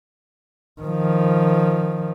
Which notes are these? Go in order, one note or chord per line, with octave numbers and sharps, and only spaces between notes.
D#3 F3